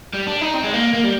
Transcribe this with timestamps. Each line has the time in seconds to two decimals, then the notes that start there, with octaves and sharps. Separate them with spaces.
0.13 G3
0.27 D4
0.41 D#4
0.54 C4
0.64 G#3
0.74 A#3
0.94 A#3
1.04 G3